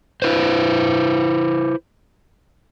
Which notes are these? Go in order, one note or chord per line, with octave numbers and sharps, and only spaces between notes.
E4 B4 C5